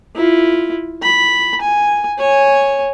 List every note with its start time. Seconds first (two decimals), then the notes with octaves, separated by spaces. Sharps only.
0.16 E4 F4
1.02 B5
1.61 G#5
2.18 C#5 G#5